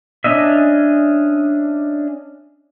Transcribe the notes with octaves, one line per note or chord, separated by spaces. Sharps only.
C#4 D4 D#5 E5